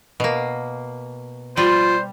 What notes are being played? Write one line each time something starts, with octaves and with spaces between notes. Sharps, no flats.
B2 A#3
G3 F4 C5